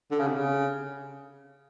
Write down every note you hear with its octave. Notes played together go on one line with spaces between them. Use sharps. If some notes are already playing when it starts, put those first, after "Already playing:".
D3
C#3
C3
C#3